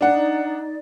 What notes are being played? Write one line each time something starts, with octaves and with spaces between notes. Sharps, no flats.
D4 D#4 D5 F#5